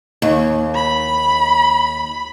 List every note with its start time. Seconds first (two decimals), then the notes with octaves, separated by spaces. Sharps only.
0.22 D#2
0.75 B5